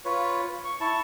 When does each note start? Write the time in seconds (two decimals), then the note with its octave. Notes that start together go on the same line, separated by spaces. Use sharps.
0.05 F4 B4 C#5
0.65 C#6
0.81 E4 A5 C#6